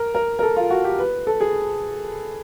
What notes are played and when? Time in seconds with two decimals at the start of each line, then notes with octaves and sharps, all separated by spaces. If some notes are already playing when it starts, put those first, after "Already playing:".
Already playing: A#4
0.15 A#4
0.39 A#4
0.42 A4
0.56 F4
0.70 F#4
0.84 G4
0.99 B4
1.27 A4
1.41 G#4